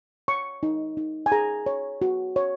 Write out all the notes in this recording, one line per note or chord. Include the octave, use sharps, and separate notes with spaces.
C#5 C#6
D#4
D#4
G#5
G#4 A#5
C#5
F#4
C#5